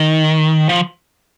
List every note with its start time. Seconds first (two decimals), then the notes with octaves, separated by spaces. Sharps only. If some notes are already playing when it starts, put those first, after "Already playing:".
Already playing: D#3
0.69 F3